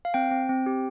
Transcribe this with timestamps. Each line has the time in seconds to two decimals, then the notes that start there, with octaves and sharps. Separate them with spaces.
0.05 F5
0.14 C4 G5
0.31 C4
0.49 C4
0.66 G4